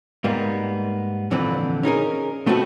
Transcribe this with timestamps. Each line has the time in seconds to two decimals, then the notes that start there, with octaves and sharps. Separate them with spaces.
0.24 G#2 G3 A#3 B3
1.31 F2 A#2 D3 E3 C4 B4
1.83 C#4 D#4 G#4 A#4
2.46 B2 A3 B3 C4 F#4 A4